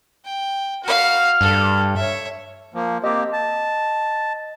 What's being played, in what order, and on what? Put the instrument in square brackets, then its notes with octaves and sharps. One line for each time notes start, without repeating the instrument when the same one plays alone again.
[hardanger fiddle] G5
[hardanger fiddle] F#4 F5 [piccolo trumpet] F6
[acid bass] G2 [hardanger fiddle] A4
[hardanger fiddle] C#5 E5
[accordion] F3 A#3
[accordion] A#3 C4 G4 [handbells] D#5
[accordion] A5